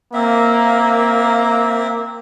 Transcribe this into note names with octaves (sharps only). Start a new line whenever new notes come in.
A#3 C4 E5